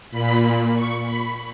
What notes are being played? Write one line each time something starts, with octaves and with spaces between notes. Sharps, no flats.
A#2 B5
C#6
B5